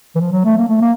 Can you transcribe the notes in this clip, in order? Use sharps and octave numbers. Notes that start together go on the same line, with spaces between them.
E3
F3
F#3
A3
A#3
A3
A#3